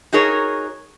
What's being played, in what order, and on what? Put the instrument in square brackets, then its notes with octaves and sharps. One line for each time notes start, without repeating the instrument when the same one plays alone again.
[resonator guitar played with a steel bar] D#4 F#4 G#4 A#4 C#5